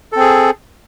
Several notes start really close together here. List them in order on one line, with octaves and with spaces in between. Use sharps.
A4 C4 G#4